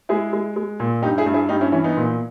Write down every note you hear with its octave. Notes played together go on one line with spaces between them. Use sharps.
G#3 E4 G#4
G#3
G#3
A#2
G2 D#4 G4
E4 G#4
G2
E4 G#4
G2 D#4 G4
C#4 E4
E3 C#4 E4
B3 D#4
A#2